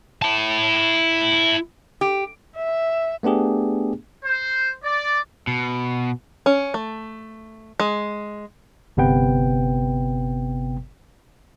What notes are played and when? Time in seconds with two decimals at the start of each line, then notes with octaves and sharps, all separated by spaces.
0.22 E4 A5
2.01 G4
2.56 E5
3.23 A3 B3 D4 G4 G#4
4.24 C5
4.84 D5
5.47 B2
6.46 C#4
6.74 A3
7.80 G#3
8.97 G1 C3 B3 B4 G5